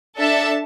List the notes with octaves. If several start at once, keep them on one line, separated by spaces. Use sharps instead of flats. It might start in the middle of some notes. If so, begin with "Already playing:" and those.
D4 A4 E5 A5